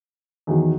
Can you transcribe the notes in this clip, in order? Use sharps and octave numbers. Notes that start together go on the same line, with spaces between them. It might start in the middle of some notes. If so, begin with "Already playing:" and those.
E2 D#3 F#3